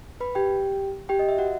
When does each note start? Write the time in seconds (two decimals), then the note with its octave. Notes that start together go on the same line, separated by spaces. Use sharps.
0.20 B4 B5
0.35 G4 G5
1.09 G4 G5
1.19 D#5
1.29 E5
1.38 F#4 F#5